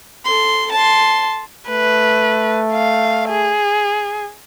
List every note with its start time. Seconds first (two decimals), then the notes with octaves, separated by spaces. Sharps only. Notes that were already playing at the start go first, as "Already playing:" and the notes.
0.24 A4 C6
0.72 A5 C6
1.69 A3 B4
2.73 F5
3.29 G#4